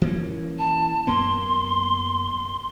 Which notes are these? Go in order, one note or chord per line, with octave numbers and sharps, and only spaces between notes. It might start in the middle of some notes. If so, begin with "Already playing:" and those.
E3 A#3 C#4
A5
F#2 A#3 B3 C6